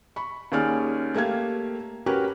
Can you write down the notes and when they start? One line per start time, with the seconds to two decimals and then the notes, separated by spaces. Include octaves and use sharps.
0.16 B5 C#6
0.52 D#2 C#4 G#4 D5 F6
1.14 A3 A#3 G4 F5 G#6
2.06 C#4 F#4 G4 A#4 B4 G#5